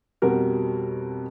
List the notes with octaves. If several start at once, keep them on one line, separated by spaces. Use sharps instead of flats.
F2 B2 G3 F#4 A#4